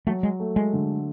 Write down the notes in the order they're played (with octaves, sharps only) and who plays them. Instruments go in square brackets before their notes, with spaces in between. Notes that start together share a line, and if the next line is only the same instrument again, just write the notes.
[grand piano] F#3 [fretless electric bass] A3
[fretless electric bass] G#3
[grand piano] A3
[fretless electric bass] G#3
[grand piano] D3